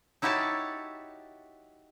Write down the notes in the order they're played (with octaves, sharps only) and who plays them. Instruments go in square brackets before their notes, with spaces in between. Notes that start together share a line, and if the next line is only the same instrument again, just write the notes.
[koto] D#4 E4 F#4 G4 C#5 A5